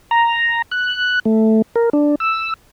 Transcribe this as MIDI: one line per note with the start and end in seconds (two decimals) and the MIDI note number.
0.11 0.62 82
0.71 1.19 90
1.25 1.62 57
1.76 1.90 70
1.93 2.15 62
2.20 2.54 88